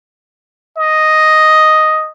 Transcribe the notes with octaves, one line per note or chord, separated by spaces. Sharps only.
D#5